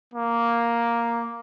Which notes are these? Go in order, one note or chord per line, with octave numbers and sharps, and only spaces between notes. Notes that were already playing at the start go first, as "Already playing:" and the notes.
A#3